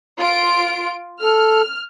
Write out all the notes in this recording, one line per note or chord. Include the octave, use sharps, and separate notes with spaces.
F4 D7
A4 F6